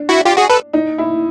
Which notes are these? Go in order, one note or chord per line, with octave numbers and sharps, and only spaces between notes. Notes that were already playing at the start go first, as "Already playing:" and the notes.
Already playing: D4
E4 F#4
F4 G4
F#4 G#4
A4 B4
D#4
E4